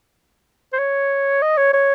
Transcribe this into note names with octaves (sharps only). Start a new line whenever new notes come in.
C5
C#5
D#5
C#5
C#5